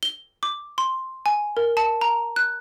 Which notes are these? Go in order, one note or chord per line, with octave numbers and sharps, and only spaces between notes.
G7
D6
C6
G#5
A#4
A5
A#5
F#6